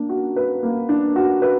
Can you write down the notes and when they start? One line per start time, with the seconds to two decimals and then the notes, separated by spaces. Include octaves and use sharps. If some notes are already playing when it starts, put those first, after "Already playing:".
Already playing: A#3 D4
0.09 F#4
0.36 B4
0.63 A#3
0.89 D4
1.16 F#4
1.42 B4